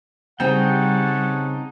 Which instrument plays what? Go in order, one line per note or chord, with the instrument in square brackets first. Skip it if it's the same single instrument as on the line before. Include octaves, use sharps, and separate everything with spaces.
[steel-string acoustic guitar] C#3 C4 [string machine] G3 [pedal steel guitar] D#4 G5 [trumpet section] C#5 F#5 A5